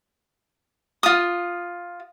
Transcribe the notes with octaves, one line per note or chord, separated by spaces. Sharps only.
F4 D#6